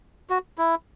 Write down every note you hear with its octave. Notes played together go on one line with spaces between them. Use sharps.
F#4
E4